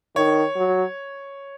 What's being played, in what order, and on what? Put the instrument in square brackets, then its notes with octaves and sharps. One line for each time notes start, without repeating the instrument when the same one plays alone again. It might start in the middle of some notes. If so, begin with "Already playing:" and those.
[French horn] D#3 [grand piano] C#5
[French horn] F#3